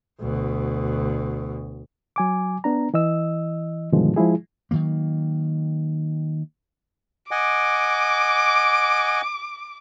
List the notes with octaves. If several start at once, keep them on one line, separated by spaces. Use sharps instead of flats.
D2 B2
F#3 G#5 D6
B3 D4 A#5
E3 D#5 E6
G2 B2 D3 D#3 F3 G#3
F3 G#3 E4 G#4
D#3 F3 F#3 A#3
D#5 F#5 G#5 D6